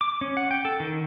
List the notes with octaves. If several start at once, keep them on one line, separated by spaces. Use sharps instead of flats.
D6
C#4
F#5
G5
A4
D#3